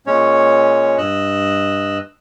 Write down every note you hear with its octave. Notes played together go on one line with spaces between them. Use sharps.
A#2 G#3 C#4 C#5
G2 D#5 E6 F#6